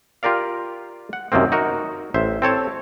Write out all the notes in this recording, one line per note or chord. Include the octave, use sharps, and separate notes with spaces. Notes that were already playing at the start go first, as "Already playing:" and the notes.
F4 G4 A#4 D5 F5
F#5
F#2 C3 D#3 A#3 C4
D#4 F#4 A#4
A1 C5 E5
C4 A4 C#5 A5